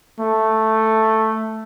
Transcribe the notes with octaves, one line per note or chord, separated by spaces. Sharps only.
A3